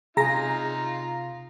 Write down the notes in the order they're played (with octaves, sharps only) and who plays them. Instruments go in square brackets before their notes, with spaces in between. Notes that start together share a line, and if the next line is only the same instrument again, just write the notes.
[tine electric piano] C3 [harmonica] D#4 F4 [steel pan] G#4 [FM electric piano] A#5 A#6